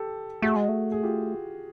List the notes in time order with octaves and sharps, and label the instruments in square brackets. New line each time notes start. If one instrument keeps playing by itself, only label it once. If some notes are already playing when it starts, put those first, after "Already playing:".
Already playing: [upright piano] G4 A4
[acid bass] A3 [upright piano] F#4 G#4
[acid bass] G#3
A3
[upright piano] G#4
F4 G4